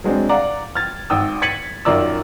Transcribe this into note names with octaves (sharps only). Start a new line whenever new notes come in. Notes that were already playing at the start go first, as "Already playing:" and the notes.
F#3 G#3 C4 D4
D5 F5 F#5 A#5
F6 G#6 A6
G#1 G5 D#6 E6
G#6 A6 B6 C#7 D#7 F#7
F#2 D#3 F4 D5 A#5 E6